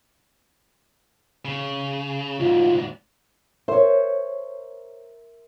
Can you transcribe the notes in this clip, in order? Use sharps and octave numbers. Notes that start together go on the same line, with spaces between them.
C#3
D2 G#2 F4
A#4 C5 C#5 E5 C6